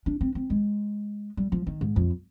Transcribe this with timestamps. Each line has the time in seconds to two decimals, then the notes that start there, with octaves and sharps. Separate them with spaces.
0.06 D4
0.21 C4
0.35 C4
0.50 G#3
1.37 G3
1.52 F3
1.67 D#3
1.81 G#2
1.96 F2